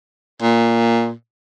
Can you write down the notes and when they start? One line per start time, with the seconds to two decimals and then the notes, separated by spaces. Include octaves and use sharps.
0.42 A#2